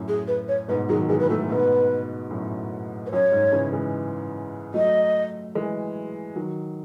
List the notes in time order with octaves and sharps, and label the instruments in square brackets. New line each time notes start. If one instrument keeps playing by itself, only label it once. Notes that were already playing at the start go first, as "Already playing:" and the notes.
Already playing: [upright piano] F#2 A2
[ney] G#4
B4
C#5
[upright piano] G#2 B2 [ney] B4
[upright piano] D#3 F#3 [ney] G#4
[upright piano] E3 G#3 [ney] G#4
[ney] B4
[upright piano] F#3 A3 [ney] A4
[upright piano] G#2 B2 [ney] B4
[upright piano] F#2 A2
[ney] B4
[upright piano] F#2 [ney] C#5
[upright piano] G#2
C#3 E3
E3 G#3
[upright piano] F#3 A3 [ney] D#5
[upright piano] E3 G#3
D#3 F#3